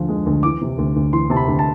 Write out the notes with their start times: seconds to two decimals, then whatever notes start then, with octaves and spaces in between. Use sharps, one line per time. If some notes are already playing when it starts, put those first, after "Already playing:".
Already playing: D2 D3 F3
0.09 G#3
0.26 D2
0.43 E3 D6
0.61 C3
0.78 D2
0.96 D2
1.12 E3 C6
1.30 C3 A5
1.36 B5
1.48 D2
1.59 A5